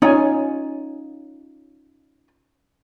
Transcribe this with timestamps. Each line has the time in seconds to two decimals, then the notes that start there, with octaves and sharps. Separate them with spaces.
0.02 C#4 D#4 F4 G#5